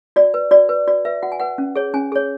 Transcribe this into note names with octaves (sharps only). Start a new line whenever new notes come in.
F#4 D5
B4
F#4 D5
B4
F#4 D5
B4 E5
F#4 F#5
G#5
B4 F#5
C#4
G#4 C#5
C#4 G#5
G#4 C#5